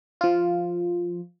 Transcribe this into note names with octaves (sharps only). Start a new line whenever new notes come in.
F3 F4